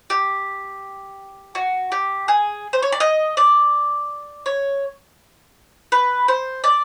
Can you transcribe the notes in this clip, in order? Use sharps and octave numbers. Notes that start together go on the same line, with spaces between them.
G4
F#4
G4
G#4
C5
C#5
D5
D#5
D5
C#5
B4
C5
D5